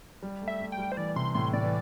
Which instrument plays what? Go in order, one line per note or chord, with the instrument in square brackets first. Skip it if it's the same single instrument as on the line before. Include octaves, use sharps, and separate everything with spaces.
[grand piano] G3
A3
[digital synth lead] E5
[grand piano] A3
[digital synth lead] G5
[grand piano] G3
[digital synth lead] C5
[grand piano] E3 [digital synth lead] D5
[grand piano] C3 [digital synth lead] C6
[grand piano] A2 [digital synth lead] C6
[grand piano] A2 [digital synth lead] D5
[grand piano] E3